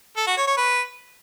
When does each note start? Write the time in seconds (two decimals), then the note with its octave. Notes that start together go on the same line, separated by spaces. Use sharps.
0.17 A4
0.27 F#4
0.37 C#5
0.47 C#5
0.57 B4